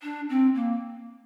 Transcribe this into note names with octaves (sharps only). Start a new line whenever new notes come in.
D4
C4
A#3